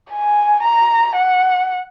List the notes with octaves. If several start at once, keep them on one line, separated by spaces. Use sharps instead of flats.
G#5
A#5
F#5